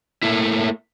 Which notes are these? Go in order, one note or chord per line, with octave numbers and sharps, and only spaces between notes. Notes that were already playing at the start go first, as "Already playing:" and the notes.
A3 A#3 E4